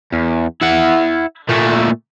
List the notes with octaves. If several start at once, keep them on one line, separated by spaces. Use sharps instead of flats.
E2
E4 F#5
A#2 A3